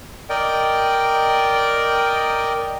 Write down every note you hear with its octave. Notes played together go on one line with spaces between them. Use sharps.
A#4 D5 D#5 G5